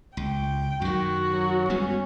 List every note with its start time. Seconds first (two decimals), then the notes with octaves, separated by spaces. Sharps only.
0.17 C#2 G5
0.82 F#2 D#3 F#4
1.33 F#3
1.70 G3 G#3 B3 C#4